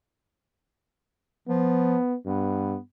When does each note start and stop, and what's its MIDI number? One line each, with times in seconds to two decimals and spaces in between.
1.48 1.97 53
1.48 2.15 59
2.26 2.76 43
2.26 2.80 59